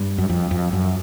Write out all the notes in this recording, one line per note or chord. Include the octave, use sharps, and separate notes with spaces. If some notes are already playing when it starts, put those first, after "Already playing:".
Already playing: G2
F#2
F2
F2
F#2